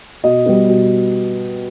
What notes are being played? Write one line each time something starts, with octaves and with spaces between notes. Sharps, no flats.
B2 D#5
G3 B3
B2